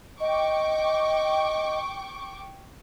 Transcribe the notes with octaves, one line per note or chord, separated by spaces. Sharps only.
D#5 G5 C#6 D6